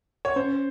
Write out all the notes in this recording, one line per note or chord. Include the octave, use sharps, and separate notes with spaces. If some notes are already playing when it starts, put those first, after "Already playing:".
C#5
C#4 C5